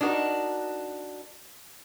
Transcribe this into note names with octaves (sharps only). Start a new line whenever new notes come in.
D4 D#4 F#4 A#4